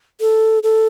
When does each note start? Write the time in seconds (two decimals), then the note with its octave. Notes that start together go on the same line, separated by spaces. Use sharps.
0.21 A4
0.63 A4